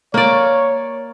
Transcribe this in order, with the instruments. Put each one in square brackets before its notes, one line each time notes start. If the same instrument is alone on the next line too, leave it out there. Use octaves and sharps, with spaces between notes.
[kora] A#3 D5 [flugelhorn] C#5